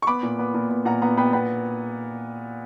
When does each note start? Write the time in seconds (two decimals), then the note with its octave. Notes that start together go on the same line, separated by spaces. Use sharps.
0.02 C#6
0.07 B3 B5 D6
0.23 A#2
0.39 B3
0.54 A#2
0.69 B3
0.85 A#2 F#5 A#5
1.02 B3 F#5 A#5
1.17 B3 G5 B5
1.33 B3 G5 B5